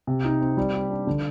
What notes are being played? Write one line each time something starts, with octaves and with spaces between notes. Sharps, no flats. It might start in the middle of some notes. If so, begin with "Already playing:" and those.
C3
D#4
C4
G3
G4
D4
D3